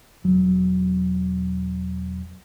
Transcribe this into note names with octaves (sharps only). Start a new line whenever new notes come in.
E1 F#3